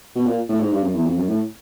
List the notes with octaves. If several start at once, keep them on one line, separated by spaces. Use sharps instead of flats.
B2
A#2
A2
G#2
G2
F#2
E2
F2
F#2
A2